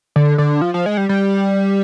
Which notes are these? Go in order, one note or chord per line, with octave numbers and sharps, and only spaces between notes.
D3
D3
F3
F3
G#3
G3
G3